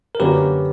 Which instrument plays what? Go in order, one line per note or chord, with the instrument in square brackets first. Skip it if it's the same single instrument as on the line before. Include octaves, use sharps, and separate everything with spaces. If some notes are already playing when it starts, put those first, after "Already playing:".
[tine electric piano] A#4
[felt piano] F#2 D3 A#3 C#4 F#4 [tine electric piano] G4 B4